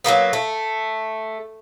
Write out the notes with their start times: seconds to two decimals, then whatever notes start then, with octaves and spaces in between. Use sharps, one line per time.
0.04 F#3 G3 A#3 B3
0.33 A3